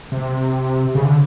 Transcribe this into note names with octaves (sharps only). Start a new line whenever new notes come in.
C3
C#3
D3